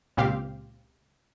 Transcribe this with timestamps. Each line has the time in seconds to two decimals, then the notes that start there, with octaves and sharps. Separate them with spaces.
0.17 C#2 A#2 C4 G4 F5